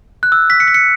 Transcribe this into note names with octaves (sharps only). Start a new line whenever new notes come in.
F#6
E6
B6
C#7
B6
C#7